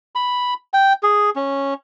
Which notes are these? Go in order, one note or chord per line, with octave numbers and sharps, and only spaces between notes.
B5
G5
G#4
C#4